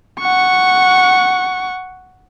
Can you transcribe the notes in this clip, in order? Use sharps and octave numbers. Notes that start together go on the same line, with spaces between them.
F#5 C#6